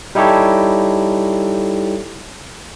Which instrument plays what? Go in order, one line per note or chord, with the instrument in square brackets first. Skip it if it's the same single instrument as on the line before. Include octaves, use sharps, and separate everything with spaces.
[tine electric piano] G3 D#4 E4 G4 A4 C#5